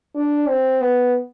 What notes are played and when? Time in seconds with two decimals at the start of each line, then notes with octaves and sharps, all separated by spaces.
0.15 D4
0.48 C4
0.81 B3